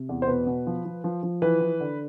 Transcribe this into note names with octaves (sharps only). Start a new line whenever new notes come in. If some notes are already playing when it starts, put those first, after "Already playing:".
Already playing: C3
E2
C5
B2 B4
B2
F3
F3
F3
F3
E3 B4
E3
D3